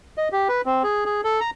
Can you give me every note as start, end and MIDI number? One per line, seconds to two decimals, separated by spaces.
0.17 0.28 75
0.32 0.48 67
0.48 0.61 71
0.66 0.83 60
0.83 1.05 68
1.06 1.21 68
1.24 1.40 69
1.41 1.50 82